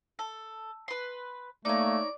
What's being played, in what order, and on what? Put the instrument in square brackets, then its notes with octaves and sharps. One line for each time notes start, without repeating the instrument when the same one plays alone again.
[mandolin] A4
B4 C6
[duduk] A3 [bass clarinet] A#3 [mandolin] D#4 C#5 [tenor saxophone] D5